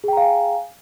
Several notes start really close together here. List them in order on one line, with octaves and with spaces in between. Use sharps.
G#4 G5 A#5 F5 G#5